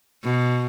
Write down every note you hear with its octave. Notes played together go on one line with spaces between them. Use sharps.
B2